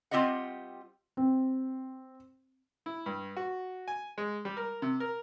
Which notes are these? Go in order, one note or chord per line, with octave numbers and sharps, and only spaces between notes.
G3 C4 F4 G4 D#5 F#5
C4
E4
G2
F#4
G#5
G#3
G3
A#4
C3
A#4